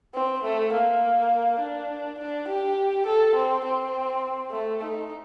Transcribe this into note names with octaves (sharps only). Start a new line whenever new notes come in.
C4
A3
A#3
D4
D4
G4
A4
C4
C4
A3
D#4